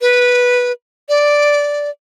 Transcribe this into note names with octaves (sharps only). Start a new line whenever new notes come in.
B4
D5